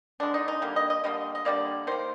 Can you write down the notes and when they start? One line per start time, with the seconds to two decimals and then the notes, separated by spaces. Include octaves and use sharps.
0.20 D3 G#3 D4
0.34 D#4
0.48 D#4
0.62 D3 G3 A#3
0.76 D#5
0.90 D#5
1.04 D3 G3 A#3 D#5
1.35 D#5
1.45 D3 G3 A#3 D5
1.87 D#3 A#3 C5